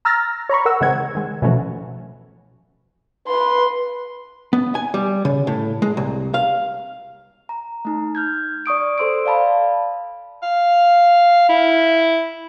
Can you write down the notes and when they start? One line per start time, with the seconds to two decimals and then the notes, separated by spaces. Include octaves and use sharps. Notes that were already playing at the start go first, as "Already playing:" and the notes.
0.05 A#5 E6 F6 A6 A#6
0.49 C#5 A#5 B5 C#6
0.65 A#4 F#5 E6
0.81 C#3 E3 G#3 C4 F#5 G#6
1.15 D#3 G#3
1.42 B2 E3 F3 A3 C#4 F#4
3.28 B4 C6
4.53 B3
4.75 G#5
4.94 G3
5.25 C#3
5.47 A2
5.82 G#3
5.97 C2
6.34 F5
7.49 A#5
7.85 A3 D#4
8.15 F6 G6 G#6
8.66 D5 C#6 D#6 D7
8.98 A4 C5 C6 E6 D7
9.25 D5 F5 A5 B5
10.43 F5
11.49 E4